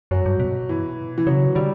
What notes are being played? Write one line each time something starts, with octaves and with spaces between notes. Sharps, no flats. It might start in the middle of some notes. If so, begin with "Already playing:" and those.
F#2 F#3
G2
B2
E3
E3
C#3 F#3
D3 G3